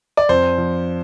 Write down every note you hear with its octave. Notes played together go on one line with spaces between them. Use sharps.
D5
F2 C5
F3